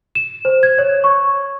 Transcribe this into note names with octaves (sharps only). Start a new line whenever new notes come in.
E7
C5
G#6
C#5
C#6